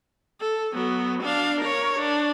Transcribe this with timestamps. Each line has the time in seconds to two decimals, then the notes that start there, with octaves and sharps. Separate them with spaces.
0.40 A4
0.73 F#3 B3
1.23 D4 F5
1.61 A#4 C#5
1.99 D4